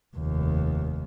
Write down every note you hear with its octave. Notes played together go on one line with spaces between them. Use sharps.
F1 D#2